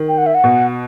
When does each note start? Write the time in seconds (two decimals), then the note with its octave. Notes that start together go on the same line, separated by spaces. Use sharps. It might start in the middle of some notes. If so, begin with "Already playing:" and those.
Already playing: D#3
0.08 G5
0.18 F#5
0.26 E5
0.34 F#5
0.44 B2